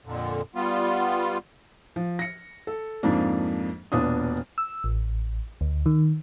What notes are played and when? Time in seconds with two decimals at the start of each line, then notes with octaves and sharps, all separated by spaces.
0.06 F2 A#2 D3
0.55 G3 B3 F4
1.96 F3
2.19 A#6 C#7
2.67 A4
3.03 F2 G#2 F3 A#3 D4
3.92 E1 A#2 B3 D4 F4 D#6
4.58 E6
4.84 A1
5.61 D2
5.86 D#3